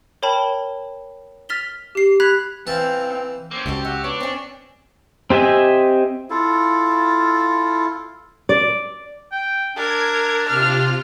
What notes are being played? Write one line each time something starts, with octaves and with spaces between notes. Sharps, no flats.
A#4 C#5 G5 A5 B5
F6 A6 B6 F7 G7
G4 C7
B5 F#6 G#6 B6 F7
E3 C4 F5 A5
A#3 C4 C#4
C#2 F#4 G4 A4 D5
F#4 E5
B3 D4 C#5
C4 C#4
C4 G4 D#5 E5 G#5
E4 F4 A4 F5
D5
G5
D4 A#4 G#6
C3 F4 F6